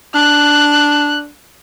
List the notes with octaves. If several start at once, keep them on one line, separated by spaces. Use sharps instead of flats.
D4 F#6